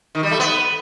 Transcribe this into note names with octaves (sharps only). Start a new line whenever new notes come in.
D#3
G3
A3
B3